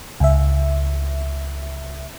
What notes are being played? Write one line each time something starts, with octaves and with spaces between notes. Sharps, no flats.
C#2 E5